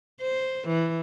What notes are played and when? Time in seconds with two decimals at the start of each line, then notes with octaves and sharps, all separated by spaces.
0.21 C5
0.68 E3